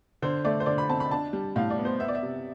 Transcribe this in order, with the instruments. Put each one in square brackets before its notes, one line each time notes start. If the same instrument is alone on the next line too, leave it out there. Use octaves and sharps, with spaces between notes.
[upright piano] D3 C5
A3 D5
C5
D3 D5
B5
C4 A5
B5
D4 A5
G3
A2 F5
D5
B3
C5
B3 E5
D5
E5
C3